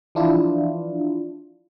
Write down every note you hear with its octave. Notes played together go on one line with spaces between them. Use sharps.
E3 F3 D4 E4 F4